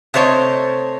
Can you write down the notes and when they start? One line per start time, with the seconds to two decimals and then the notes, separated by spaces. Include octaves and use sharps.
0.14 C3 A3 C5 C#5 D#5